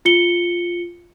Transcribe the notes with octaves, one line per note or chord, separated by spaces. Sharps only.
F4 C#7 G7